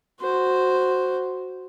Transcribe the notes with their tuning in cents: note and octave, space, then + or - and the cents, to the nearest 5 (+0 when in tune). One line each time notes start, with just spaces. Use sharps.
F#4 +0 C5 +0